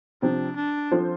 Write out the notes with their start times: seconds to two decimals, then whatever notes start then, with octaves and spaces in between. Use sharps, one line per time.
0.22 C3 F3 C4 D4
0.57 D4
0.91 F3 C4 F4 A4 C5